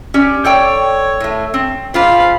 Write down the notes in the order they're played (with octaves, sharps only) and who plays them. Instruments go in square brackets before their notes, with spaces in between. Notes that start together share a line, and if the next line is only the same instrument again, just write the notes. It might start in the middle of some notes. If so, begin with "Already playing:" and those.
[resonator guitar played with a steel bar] C#4 G4 D5
[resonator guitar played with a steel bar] A4 D5 G5 [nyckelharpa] C#5
[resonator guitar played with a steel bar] A2 A3
C4
[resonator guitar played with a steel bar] G#2 F4 C5 [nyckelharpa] F5 B5